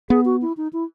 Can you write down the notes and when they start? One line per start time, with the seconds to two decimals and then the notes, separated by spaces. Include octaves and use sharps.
0.09 B3 G#4
0.25 F#4
0.42 E4
0.57 D#4
0.73 E4